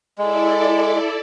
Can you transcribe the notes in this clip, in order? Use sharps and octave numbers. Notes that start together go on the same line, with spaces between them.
G#3 E4 A4 D5